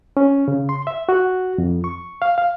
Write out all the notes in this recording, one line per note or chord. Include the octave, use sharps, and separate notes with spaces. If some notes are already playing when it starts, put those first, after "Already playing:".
C#4
C#3
C6
E5
F#4
F2
C#6
F5
F5